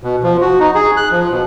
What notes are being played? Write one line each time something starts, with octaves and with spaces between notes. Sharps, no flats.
B2
F3
F#4
D#4
G#4
F#6
F3
B2